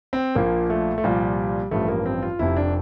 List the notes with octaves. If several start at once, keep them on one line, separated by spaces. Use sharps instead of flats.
C4
A#1 A#2 F3 A#3
A3
A3
C2 A#2 F3 G3
A1 G2 F3 A3
A#3
C4
F4
F1 F2 C3 E4
D4